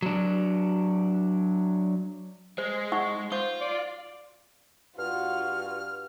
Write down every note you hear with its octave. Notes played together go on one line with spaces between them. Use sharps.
F#3 D4
G#3 G#4 C5
D#4 F#5 C#6
F4 C5 D6
D5
G2 F4 F#4 F6